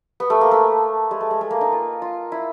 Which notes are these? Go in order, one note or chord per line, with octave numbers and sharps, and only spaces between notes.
B3
A3
A#3
A3
G#3
A3
G#3
A3
A#3
D#4
F4
F4
E4